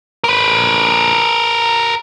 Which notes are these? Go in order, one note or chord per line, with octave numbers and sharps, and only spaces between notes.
A#4 B4